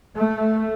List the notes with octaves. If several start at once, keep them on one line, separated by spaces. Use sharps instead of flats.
A3